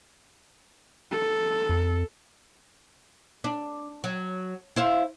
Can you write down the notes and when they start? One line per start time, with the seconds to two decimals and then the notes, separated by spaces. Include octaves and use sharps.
1.12 A4
1.69 F2
3.44 D4
4.04 F#3
4.76 E4 C5 F5